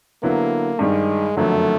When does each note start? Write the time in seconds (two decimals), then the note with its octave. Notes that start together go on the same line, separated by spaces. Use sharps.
0.23 D3 F#3 A#3 B3 E4
0.79 G2 D#3 G3 G#3
1.36 F#1 F2 D3 F#3 A3